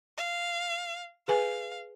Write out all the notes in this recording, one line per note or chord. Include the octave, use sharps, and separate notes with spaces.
F5
G#4 B4 F5 G#5